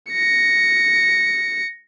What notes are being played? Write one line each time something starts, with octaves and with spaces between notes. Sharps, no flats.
A#6 C#7